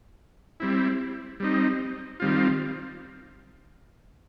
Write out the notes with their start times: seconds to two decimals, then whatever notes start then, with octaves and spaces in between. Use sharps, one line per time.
0.60 G3 C4 E4
1.40 G3 C4 D#4
2.20 D#3 G3 C4 F4